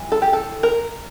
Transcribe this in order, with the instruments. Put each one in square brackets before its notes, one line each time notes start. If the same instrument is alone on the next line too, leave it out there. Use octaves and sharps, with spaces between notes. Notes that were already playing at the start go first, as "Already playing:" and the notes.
Already playing: [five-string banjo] E3 G3
A4
G4
A4
A#4